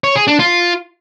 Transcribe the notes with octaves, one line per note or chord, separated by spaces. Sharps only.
C#5
G#4
D4
F4